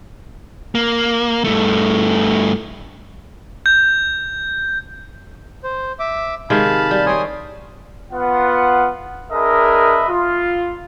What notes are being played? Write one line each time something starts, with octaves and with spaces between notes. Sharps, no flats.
A#3
G2 A3
G6
C5
E5 D6
C3 D#3 G#3 F5 A5 B5
G3
C4 C#5 G#5 C6 D#6
B3 F4 F#5
D4 G#4 A#4 B4 D#5 E5
F4